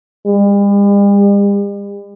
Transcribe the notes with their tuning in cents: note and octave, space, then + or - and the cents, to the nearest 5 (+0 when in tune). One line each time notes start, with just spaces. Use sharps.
G3 +45